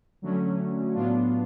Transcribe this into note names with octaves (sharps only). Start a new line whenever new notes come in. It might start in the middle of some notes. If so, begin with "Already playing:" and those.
D3 F#3 A3 C#4
A2 F#3 B3 D4 F4